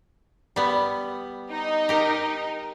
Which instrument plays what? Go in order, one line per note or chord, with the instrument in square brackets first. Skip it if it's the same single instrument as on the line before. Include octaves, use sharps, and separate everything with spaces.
[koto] G3 B3
[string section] D#4
[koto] G4 A#4